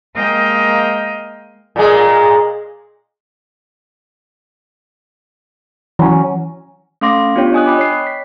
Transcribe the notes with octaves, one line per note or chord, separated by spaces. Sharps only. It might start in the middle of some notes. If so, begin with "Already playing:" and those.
G#3 A#3 D#5 F5 G5 G6
A#2 G#3
E3 F#3 C#4
A3 C#4 F5 C6 D6 A#6
B3 D4 F4 G4 C#5 G5
D#5 G#5 D#6 F#6
D#5 G5 B5 D6
C#5 C7
B6